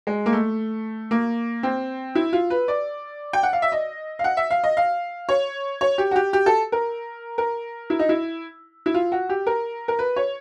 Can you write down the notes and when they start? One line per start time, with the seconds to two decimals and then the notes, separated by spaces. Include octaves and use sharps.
0.07 G#3
0.26 A#3
0.32 A3
1.11 A#3
1.63 C4
2.15 E4
2.33 F4
2.50 B4
2.68 D5
3.33 G5
3.43 F#5
3.53 F5
3.62 E5
3.72 D#5
4.19 F5
4.24 F#5
4.37 E5
4.51 F5
4.64 D#5
4.77 F5
5.29 C#5
5.81 C#5
5.98 G4
6.11 F#4
6.16 G4
6.33 G4
6.46 A4
6.72 A#4
7.38 A#4
7.90 E4
7.99 D#4
8.09 E4
8.86 E4
8.94 F4
9.12 F#4
9.29 G4
9.47 A#4
9.88 A#4
9.99 B4
10.16 C#5